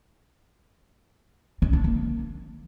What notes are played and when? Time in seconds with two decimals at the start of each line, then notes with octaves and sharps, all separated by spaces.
1.62 C4
1.73 D4
1.84 A#3